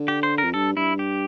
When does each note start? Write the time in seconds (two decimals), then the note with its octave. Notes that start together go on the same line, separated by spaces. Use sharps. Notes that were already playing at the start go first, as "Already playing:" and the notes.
Already playing: D3
0.08 G4
0.23 C5
0.38 A#4
0.44 F2
0.54 G2 A4
0.76 G2 E4
0.99 G4